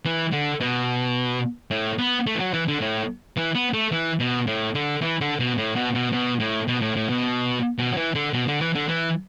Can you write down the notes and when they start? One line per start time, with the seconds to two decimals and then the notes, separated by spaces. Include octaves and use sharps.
0.05 E3
0.32 D3
0.60 B2
1.71 A2
1.98 B3
2.26 A3
2.35 E3
2.40 F#3
2.53 E3
2.68 D3
2.81 A2
3.37 E3
3.55 B3
3.73 A3
3.92 E3
4.20 B2
4.47 A2
4.75 D3
5.02 E3
5.21 D3
5.39 B2
5.58 A2
5.76 B2
5.95 B2
6.13 B2
6.40 A2
6.68 B2
6.81 A2
6.96 A2
7.09 B2
7.78 B2
7.92 F#3
7.97 E3
8.15 D3
8.33 B2
8.48 D3
8.61 E3
8.75 D3
8.89 E3